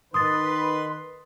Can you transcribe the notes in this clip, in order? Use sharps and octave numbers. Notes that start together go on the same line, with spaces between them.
D#3 B4 C6 D#6 A6